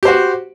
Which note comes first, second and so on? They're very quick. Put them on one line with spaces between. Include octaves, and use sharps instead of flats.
G4 C5 F#4